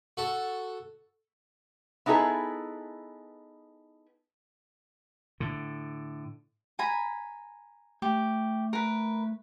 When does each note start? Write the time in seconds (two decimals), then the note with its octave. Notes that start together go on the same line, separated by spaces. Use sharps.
0.17 F#4 A4
2.06 B3 D#4 E4 G#4 A4 B4
5.40 A2 D3
6.79 G#5 A#5 B5
8.02 A3 G4
8.73 A#4 B4